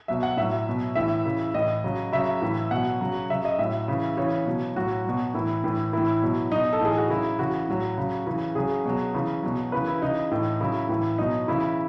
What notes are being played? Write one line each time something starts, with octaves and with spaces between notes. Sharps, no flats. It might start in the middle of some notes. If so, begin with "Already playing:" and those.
B2 F#3 E5
F#5
A2 F#3 E5
B2 F#3
A2 E3 E5
C#3 E3
A2 E3 D#5
C#3 F#3
C#3 F#3 E5
A2 E3
B2 F#3 F#5
C#3 F#3
C#3 F#3 E5
D#5
A2 F#3 E5
C#3 E3
C#3 E3 C#5
B2 F#3
A2 F#3 F#4
B2 F#3
A2 E3 E4
A2 E3
A2 E3 E4
B2 F#3
B2 F#3 D#4
A4
A2 E3 G#4
F#4
C#3 F#3 E4
C#3 E3 F#4
A2 F#3
C#3 F#3
C#3 E3
C#3 F#3 G#4
B2 F#3
C#3 E3
B2 F#3
C#3 E3 B4
E4
C#3 E3 D#4
A2 E3
C#3 F#3 E4
A2 E3
B2 F#3 D#4
C#3 E3 E4